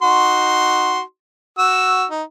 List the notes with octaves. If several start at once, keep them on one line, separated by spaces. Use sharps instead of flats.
D#4 F#4 C6
F#4 E6
D#4